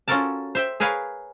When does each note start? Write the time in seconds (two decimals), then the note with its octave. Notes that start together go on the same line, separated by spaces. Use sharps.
0.08 C#4 F4 F#4 A4 A#4 A5
0.55 C5 E5 G5
0.80 G#4 A#4 B4 C#5 F5 G#5